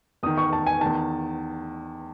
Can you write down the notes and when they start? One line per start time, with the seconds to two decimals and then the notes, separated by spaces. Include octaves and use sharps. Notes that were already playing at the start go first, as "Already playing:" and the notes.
0.23 E2 D#6
0.26 D#3
0.37 C#6
0.53 A5
0.67 G#5
0.81 D#3 A5
0.86 E2